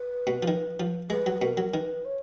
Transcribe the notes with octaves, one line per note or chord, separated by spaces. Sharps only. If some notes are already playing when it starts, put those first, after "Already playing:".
Already playing: B4
B2
F3
D#3
F3
G#3 B4
F#3
B2 A#4
F#3
D#3 B4
C#5